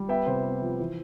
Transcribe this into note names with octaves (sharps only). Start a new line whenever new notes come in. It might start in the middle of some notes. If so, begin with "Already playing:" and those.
Already playing: G3
B3 E5 G5
C3 C5 E5
B3
F3
E3